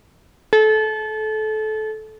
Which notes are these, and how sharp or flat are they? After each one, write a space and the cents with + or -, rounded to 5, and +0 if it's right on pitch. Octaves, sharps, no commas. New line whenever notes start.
A4 -25